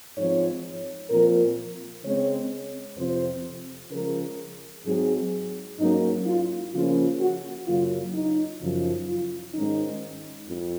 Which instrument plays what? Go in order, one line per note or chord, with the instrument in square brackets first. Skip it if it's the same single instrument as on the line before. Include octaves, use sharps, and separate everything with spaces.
[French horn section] G#2 F3 C4 C#5
A#2 F3 C4 A#4
C#3 G#3 C4 C#5
F2 C3 F3 C4 C5
C#3 F3 G#3 A#4
G#2 F#3 C4 G#4
G#2 F#3 A#3 C#4 D#4
F4
C#3 F3 A#3 C#4 F4
F#4
F#2 C#3 F#3 A#3 F4
D#4
F#2 C#3 F3
F4
G#2 D#3 G#3 C#4 D#4
F2